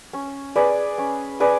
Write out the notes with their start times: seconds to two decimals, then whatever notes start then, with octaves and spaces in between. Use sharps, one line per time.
0.13 C#4
0.56 G#4 B4 D5
0.98 C#4
1.40 G#4 B4 D5